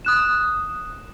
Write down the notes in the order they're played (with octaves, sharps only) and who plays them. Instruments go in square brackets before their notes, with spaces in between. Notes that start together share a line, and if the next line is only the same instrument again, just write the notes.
[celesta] D#6 F#6 E7